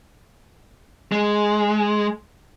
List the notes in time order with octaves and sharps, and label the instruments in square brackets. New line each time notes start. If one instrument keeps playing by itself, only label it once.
[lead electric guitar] G#3